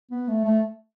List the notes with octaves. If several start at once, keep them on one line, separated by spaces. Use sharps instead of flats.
B3
A3
A3